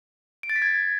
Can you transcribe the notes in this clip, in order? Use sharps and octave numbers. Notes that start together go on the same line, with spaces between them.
D7
A6
B6
G#6